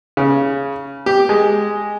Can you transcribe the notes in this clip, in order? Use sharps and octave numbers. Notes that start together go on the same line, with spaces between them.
C#3
G4
G#3